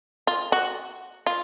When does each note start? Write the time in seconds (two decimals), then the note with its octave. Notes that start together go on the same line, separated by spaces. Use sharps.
0.27 F4
0.52 F#4
1.26 F4